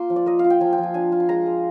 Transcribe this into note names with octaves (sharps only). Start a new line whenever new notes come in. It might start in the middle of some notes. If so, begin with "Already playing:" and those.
Already playing: A#3 F4 C6 D6
F3
D5
A#3 D#5
F5
F4
G5
F3 G#5
G5
F3
G#5
D4 G#5
F4
C6
G#3 A#5
G#3